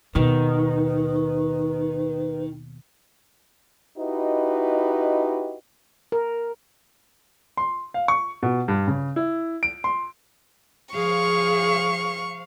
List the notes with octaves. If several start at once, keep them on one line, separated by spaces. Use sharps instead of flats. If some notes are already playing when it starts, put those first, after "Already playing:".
D#2 B2 D#3 B4
D#4 E4 F#4 G4 B4 D#5
A#4
C6
F5
C#6
B2
G2
C#3
E4
D7
C6
F3 G#4 C5 F5 C#6